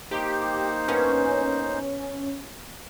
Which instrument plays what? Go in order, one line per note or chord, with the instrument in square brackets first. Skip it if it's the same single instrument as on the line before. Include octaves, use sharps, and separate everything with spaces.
[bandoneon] A#3 D#4 C5 [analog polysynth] G4
[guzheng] G2 B3 A#4 [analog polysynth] C#4